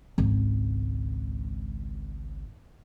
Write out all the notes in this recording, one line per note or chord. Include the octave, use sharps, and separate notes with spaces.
G#1 C#2